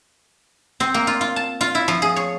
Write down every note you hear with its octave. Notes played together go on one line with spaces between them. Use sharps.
C4
A#3
F4
F4
A5
F4
E4
F3
G#4
C#5